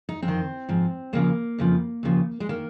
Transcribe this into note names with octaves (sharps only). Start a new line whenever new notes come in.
D#4
F2 C4
D#3
G#2 F3
D#2 C#3 F3 A#3
F2 C#3 F3
D#2 C#3 F3
G#3
D#3 A#3